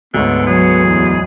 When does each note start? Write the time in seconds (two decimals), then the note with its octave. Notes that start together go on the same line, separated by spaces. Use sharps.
0.14 D2 G#2 D3 B3 C#5
0.47 F#3 G#4
0.85 E2